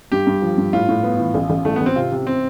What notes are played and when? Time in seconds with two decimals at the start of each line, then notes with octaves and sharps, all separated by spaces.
0.12 G2 G4
0.27 G2
0.42 F3
0.58 G2
0.73 A2 F4
0.88 A2
1.03 B3
1.19 E3
1.34 A1
1.50 A1
1.65 A1 A3
1.76 B3
1.81 A1
1.86 C4
1.96 C3 F4
2.12 C3
2.27 C3 C4